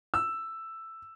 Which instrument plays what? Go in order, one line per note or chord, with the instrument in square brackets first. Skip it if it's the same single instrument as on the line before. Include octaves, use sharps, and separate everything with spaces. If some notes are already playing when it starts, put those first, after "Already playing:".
[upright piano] E6